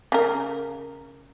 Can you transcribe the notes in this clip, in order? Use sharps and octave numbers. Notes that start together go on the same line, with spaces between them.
C#3 A#4